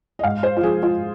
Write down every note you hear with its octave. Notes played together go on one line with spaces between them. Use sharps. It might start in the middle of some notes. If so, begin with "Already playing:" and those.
D#5
G#2 F5
C5
F4
F3 G#4
F4